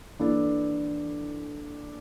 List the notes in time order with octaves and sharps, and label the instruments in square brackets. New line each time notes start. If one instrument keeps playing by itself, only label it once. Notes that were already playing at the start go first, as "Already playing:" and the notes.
[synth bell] E3 A#3 E4 A4 D5 [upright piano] D4